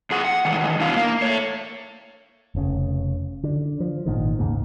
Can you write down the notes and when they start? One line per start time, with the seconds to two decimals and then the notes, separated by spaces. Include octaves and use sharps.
0.10 F2 G#4 F#5
0.24 F#5
0.45 D#3 E3 G#3
0.80 B2 D4 E4 F5
0.96 A#3
1.22 A3 C#5
2.55 F1 C#3
3.43 D3
3.80 F3
4.06 G#1 A#2 D#3
4.39 D#2 G#2 C#3 A#3